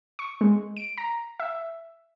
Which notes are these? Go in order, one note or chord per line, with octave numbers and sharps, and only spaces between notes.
C#6
G#3
D7
A#5
E5